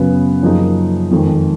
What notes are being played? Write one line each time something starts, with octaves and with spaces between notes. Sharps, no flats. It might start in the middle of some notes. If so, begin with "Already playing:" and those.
Already playing: F#2 C#3 F#3 B3
F#2 F3 A#3 D#4 G#4
F2 D#3 G#3